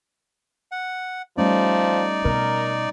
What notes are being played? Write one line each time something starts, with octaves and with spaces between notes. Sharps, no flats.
F#5
F3 G3 A3 C#4 D#4 D5
B2 A#4